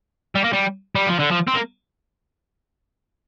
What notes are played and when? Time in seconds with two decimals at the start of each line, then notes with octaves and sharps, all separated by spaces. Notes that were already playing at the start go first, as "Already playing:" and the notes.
0.35 G3
0.44 A#3
0.53 G3
0.95 G3
1.07 F3
1.19 D3
1.31 F3
1.47 C4
1.55 A#3